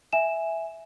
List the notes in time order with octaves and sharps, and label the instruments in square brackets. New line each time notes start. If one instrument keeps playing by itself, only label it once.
[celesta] E5 G#5 E7